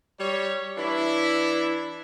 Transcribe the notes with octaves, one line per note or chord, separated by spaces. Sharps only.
G3 C#5
E3 D4 E4